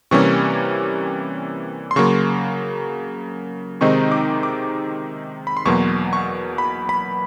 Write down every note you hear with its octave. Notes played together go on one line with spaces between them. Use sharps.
C3 E3 G3 A#3 C#4 C#6
C6
C#3 F#3 A#3 C#6
C3 D#3 G#3 C4 D#4 C#6
D6
D6
B5
C6
E2 B2 F#3 A#3 C#6
C#6
B5
B5